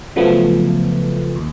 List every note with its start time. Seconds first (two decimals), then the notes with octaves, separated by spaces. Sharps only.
0.16 C#3 F3 F#3 A3 B3
1.36 D#2